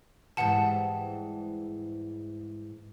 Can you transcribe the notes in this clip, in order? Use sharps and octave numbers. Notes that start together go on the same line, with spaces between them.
G#2 E3 G3 F#5 A5